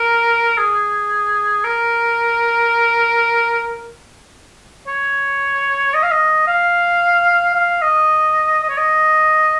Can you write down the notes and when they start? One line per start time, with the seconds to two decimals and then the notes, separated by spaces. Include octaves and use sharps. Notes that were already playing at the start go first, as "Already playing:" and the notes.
Already playing: A#4
0.57 G#4
1.64 A#4
4.87 C#5
5.94 D#5
6.03 F5
6.11 D#5
6.47 F5
7.54 F5
7.82 D#5
8.63 D#5
8.70 C#5
8.77 D#5